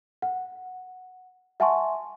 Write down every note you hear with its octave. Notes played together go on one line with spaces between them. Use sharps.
F#5
E5 F#5 G#5 A5 C6 C#6